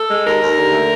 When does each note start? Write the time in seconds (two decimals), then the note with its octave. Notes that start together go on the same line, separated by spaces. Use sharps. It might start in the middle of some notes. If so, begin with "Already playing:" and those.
Already playing: A4
0.10 G#3
0.26 D#2 A#4
0.41 D#2
0.57 D3
0.72 A3